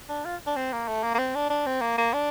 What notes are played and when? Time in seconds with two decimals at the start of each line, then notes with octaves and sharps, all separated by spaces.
0.09 D4
0.25 F4
0.47 D4
0.56 C4
0.73 A#3
0.88 A3
1.03 A#3
1.15 A#3
1.19 C4
1.35 D4
1.50 D4
1.66 C4
1.81 A#3
1.98 A#3
2.14 D4